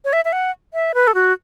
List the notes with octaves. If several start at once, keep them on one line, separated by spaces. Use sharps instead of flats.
C#5
E5
E5
F#5
E5
B4
A4
F#4